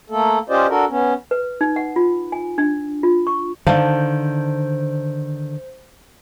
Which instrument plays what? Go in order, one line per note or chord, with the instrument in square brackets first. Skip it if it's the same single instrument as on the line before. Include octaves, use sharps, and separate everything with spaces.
[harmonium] A3 A#3 A4
C#4 F4 G4 C5 D5 D#5
D4 F#4 A4 A#4
B3 C#4
[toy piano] B4
D#4
F#5
F4
G#5
D4
F4
C#6
[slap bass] D3 D#3 [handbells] C5 [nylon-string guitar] D5 F5 A5